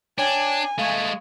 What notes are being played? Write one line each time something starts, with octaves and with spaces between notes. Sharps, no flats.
D4 C#5 G5 G#5 G#6
G#3 A3 F5 C#6 G#6